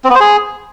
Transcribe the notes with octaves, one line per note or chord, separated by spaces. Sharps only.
C4
B3
C5
G#4